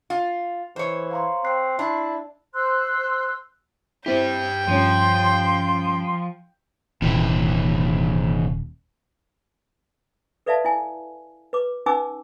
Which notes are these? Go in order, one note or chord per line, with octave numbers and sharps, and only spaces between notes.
F4
E3 C5 C#5
F5 A#5 C6
C4 C6 F#6 C7
D4 E4
C5 C6 E6 F#6
G2 G3 C4 E4 G4 G5
G2 F3 G3 C#4 C6
D#1 C3 E3
A4 B4 D5 E5 F5 A5
E4 G#5
B4 D6
C#4 D#4 B4 G#5 D6 E6